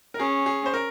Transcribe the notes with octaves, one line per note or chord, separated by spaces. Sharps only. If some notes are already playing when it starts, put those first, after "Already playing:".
A#4
C#4 G#4
G#4
C5
A#4